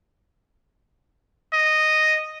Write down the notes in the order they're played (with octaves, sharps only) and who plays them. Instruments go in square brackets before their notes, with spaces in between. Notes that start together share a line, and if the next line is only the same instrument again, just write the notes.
[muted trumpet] D#5